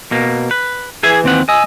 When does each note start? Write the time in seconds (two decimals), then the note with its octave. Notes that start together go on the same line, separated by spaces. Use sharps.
0.11 B2 A#3
0.51 B4
1.03 E3 G#4 E5 G#5
1.24 D#2 C4 F#5
1.49 D#5 G#5 E6